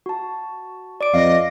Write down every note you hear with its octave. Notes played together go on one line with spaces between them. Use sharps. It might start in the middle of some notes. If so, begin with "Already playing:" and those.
F#4 A5
D5 D6 D7
F2 D#5 F5 A#6